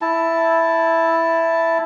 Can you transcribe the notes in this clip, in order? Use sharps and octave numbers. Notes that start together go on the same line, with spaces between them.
E4 A5